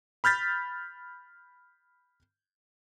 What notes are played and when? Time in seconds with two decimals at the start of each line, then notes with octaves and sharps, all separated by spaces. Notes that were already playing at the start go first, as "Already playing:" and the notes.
0.24 B5 F6 G6 A6 B6